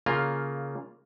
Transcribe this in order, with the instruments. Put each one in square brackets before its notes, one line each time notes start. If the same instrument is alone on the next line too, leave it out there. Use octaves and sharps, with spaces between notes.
[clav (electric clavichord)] C#3 A#3 F4